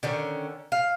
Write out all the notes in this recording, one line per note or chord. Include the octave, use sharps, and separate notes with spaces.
D3 D#3 C#4
F5